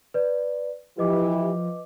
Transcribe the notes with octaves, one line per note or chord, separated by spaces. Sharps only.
B4 D5
E3 F3 E4 G4 B4 D#5 D6